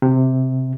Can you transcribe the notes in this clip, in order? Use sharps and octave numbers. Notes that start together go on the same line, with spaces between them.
C3